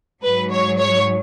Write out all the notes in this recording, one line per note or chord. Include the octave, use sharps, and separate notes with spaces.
G#2 F#3 B4
C#5
C#5